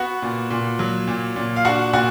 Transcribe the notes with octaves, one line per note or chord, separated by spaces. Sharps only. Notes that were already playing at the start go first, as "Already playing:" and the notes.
Already playing: B3 F#4 F#5
A#2
A#2
F#3
A#2
A#2
F5
D4 F#4 F#5
A#2 F#4 F#5